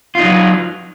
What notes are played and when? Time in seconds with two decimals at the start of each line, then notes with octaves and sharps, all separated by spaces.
0.15 F4
0.19 D#4
0.23 F#3